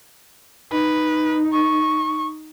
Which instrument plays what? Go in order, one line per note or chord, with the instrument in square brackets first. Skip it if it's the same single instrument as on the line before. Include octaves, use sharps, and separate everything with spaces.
[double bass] D#4 [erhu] B4
[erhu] C#6